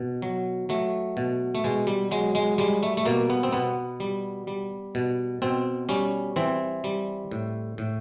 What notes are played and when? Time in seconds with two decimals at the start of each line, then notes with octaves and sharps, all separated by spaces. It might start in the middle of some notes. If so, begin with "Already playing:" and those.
Already playing: B2
0.22 F#3
0.69 F#3 A3
1.17 B2
1.55 A3
1.64 B2 G#3
1.87 G3
2.11 F#3 G#3
2.35 G#3
2.58 G3 G#3
2.83 A3
2.97 A3
3.06 B2 A#3
3.30 B3
3.43 C4
3.52 B2 B3
4.00 G3
4.47 G3
4.95 B2
5.42 B2 C4
5.89 G3 C#4
6.36 E3 C4
6.84 G3
7.31 A2
7.78 A2